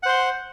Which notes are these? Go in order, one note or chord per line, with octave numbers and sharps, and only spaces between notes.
C5 F#5 C6